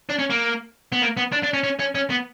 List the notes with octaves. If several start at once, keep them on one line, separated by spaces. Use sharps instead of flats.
D4
C#4
A#3
B3
A#3
B3
D4
D4
C#4
C#4
C#4
C#4
B3